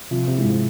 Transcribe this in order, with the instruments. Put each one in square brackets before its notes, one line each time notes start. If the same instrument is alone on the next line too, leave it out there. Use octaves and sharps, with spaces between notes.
[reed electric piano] C3 [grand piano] F3
[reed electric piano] C3
[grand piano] G#3 E4
[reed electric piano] G#2